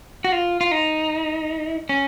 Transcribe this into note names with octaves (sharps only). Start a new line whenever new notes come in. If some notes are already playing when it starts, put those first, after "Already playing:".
F#4
F4
F4
D#4
C#4